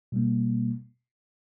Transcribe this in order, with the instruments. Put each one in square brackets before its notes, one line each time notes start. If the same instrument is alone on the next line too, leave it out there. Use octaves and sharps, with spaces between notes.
[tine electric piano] B2 G3 A#3